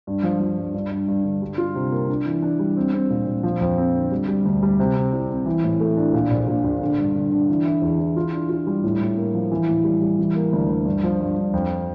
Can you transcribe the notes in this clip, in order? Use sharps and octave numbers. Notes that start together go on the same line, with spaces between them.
G2
F3
F3
G2
G2
G2
G2
D3
G3
F4
C3
A#3
D4
E3
D4
G3
C4
C4
A#2
A#2
F3
F2
C4
D3
G3
G3
D2
G3
C3
C4
C2
C4
E3
A2
A3
D4
A#2
A#1
A#2
A#1
D3
G2
D3
D3
E3
E4
E2
E3
F4
D4
F4
G3
A2
A2
A#3
F3
E3
A2
G3
G3
E3
A#3
D2
D2
G2
F3
G2
G2
F2